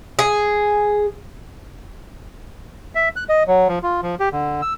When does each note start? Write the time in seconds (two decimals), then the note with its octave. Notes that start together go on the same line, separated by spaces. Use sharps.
0.19 G#4
2.95 E5
3.16 F#6
3.29 D#5
3.48 F#3
3.68 F3
3.83 F4
4.03 F3
4.20 G4
4.32 D3
4.62 E6